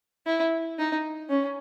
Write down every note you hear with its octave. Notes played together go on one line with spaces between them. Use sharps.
E4
D#4
C#4